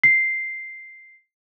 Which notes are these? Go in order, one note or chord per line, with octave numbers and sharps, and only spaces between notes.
C7